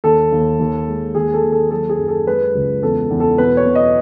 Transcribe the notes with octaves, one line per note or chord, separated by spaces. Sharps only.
D#2 A4
D#2
D#2
G#3
D#2 G#4
A4
D#2
A4
F#3 A4
G#4
F#2
A4
G#3 B4
C#2
E2 A4
E2
A4
B2 B4
C#5
B2
D#5